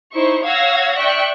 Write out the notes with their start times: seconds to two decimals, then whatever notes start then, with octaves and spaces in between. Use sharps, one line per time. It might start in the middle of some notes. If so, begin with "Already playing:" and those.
0.12 D#4 E4 C5 C#6
0.44 C#5 F5 F#5 E6 G#6 A#6
0.98 D5 E5 G5 C#6 F#6